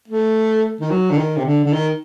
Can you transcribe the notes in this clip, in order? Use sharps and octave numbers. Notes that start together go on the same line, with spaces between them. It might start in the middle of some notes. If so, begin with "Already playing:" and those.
A3
D#3
F#3
D3
D#3
C3
D3
D3
D#3